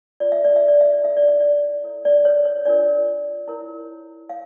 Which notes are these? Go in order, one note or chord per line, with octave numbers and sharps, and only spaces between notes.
F4 C#5 D5
E5
D5
E5
D5
E5
D5
E4 A4 C#5 E5
D5
E5
D5
E4 A4 C#5
D5
C#5
C#5
D4 F4 A#4 D5
E4 A#4 C#5
C#5 F5